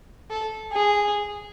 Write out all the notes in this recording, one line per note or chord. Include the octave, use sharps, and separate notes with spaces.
A4
G#4